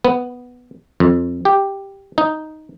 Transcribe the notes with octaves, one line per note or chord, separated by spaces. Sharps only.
B3
F2
G4
D#4